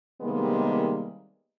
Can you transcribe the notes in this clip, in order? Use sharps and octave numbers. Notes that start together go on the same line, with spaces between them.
C3 D#3 G3 G#3 A#3 B3